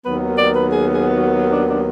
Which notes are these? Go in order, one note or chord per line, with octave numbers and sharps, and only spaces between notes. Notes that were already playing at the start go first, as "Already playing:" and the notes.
D#2 D#3 F#3 B3 B4
D5
B4
G#4
G#4
F#4
D4
D4